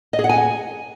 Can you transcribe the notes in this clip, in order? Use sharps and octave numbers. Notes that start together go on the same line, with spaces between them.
D#5
G#4
F#5
G#5